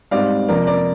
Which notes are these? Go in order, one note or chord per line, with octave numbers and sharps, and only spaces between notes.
G#2 G3 C4 D5 F5
F2 C3 F3 A#3 A#4 D5
A#4 D5